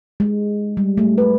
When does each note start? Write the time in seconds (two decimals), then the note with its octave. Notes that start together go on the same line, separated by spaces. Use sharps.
0.20 G#3
0.77 G3
0.98 A3
1.18 B4